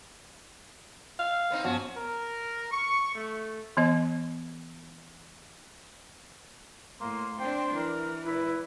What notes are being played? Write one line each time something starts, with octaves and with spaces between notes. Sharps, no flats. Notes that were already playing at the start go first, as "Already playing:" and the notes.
F5
B3 C4 D#4
G2 F3 B3 C#4 F#4 F#5
A#4
C#6
A3
E3 B3 D#5
A2 A#3 C6
C4 D4 G5
E3 A#4
C#2 A#2 E4 B4